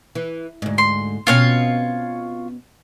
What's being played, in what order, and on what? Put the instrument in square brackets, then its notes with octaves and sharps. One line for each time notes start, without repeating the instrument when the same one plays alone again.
[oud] E3
D2 G#2
[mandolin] C6
[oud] B2 C4 C#4 [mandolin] F4 C#5 F5